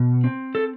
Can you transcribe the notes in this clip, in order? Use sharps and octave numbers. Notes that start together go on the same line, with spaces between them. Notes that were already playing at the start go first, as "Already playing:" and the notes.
Already playing: B2
C4
A4